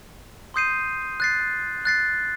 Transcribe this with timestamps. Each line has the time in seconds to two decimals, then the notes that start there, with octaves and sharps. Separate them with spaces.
0.54 C6 D#6 G6 C7 D#7
1.20 F#6 A6 C7
1.85 F#6 A6 C7